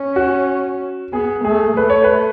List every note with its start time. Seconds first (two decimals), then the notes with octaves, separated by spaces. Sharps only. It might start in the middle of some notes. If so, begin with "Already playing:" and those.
Already playing: C#4
0.16 F#4
1.13 B3 G#4
1.45 A3 G#4
1.77 A3 B4
1.90 C#5
2.04 B4